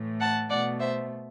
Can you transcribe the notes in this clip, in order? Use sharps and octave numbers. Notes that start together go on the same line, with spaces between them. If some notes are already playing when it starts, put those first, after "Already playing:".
Already playing: A2 E3 A3
F#5 A5
B2 A3 D5 F#5
C5 E5